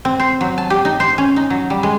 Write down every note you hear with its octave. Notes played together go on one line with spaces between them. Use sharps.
C4
C5
F#3
A5
G4
D#4
C5
C#4
D#4
F#3
G3
G#3